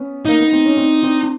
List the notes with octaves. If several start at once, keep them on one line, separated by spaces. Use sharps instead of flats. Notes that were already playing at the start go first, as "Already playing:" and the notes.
Already playing: B3 C#4
A#3 D#4
B3
C4
C#4
C4 D4
C4 D4